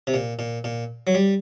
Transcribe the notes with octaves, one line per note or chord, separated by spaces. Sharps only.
C3
A#2
A#2
A#2
F#3
G3